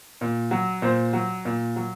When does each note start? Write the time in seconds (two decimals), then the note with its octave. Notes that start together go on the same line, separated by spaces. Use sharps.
0.21 A#2
0.51 F#3
0.82 A#2 C5
1.13 F#3
1.45 A#2
1.76 F#3